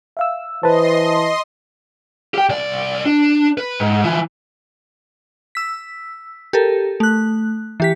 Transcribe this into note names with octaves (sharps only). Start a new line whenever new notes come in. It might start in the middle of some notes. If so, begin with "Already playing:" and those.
E5 F5 E6
E3 B4 C5 D#5 A5 C6
G4 G5
C2 D5
D4
B4
G#2
E3 F3
E6 B6
G4 A4 A#4
A3 F#6
E3 G4 B6